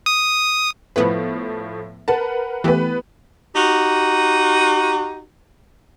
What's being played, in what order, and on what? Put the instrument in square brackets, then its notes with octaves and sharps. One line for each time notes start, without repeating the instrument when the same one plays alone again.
[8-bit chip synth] D#6
[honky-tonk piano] A2 F3 [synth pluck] B3 E4 B4
[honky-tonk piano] A#4 B4 F#5 [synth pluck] A5
[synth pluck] E3 A3 G4 [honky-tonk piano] B3 B4
[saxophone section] D#4 F#4 G4